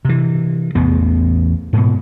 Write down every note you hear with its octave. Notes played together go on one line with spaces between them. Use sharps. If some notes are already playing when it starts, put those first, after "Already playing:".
C3 E3
A1 E2 B3
G#2 B2